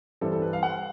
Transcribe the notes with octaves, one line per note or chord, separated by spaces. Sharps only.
G2 E3 G3 C4 E4 A4
A4
B4
F5
F#5